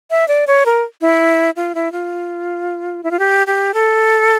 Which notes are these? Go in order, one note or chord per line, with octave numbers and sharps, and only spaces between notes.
E5
D5
C#5
A#4
E4
F4
E4
F4
E4
F4
G4
G4
A4